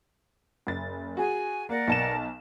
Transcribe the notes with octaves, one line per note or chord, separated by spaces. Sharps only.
F#1 A6
F#4 G#4 G#5
A#3 A#4 D5 F#5
B1 A5 E7